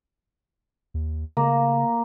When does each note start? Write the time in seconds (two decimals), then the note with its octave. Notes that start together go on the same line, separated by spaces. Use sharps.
0.94 D#2
1.37 C#3 A#3